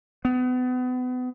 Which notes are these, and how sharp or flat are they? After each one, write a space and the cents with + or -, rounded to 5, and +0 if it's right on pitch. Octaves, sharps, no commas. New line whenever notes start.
B3 +30